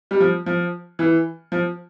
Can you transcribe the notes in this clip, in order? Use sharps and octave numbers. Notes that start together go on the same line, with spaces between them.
G3
F3
F3
E3
F3